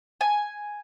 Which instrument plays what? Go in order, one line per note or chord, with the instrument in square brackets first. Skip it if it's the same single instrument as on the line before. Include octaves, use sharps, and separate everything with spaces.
[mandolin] G#5